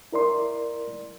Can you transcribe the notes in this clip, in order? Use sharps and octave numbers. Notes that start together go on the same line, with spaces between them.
E4 A#4 D5 C6